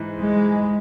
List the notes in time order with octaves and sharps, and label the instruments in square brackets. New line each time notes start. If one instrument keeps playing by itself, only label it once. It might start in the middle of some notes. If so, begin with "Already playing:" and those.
Already playing: [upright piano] G#2 E3
[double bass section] G#3